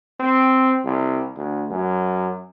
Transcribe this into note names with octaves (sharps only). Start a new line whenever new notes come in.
C4
C2
D2
F#2